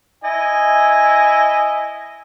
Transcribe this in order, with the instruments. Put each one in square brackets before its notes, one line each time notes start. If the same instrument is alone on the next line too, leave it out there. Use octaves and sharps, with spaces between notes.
[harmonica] E4 D#5 G#5